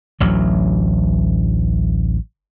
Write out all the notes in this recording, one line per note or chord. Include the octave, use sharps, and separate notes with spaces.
A1 D2 F#3